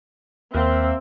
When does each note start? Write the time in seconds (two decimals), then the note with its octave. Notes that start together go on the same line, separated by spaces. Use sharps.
0.53 D#2 A#3 C4 E5 F6 F#6